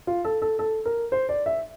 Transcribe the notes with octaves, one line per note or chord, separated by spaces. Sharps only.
F4
A4
A4
A4
A#4
C5
D5
E5